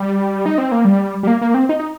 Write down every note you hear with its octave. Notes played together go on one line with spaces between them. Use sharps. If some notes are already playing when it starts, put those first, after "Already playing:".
Already playing: G3
D#4
C4
A#3
G3
G3
A#3
A#3
C4
D#4
D#4